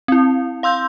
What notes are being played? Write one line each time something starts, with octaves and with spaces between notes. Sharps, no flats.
C4 E4
F5 C6 E6 G6